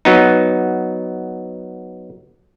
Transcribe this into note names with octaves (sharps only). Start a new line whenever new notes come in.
F#3 B3 D#4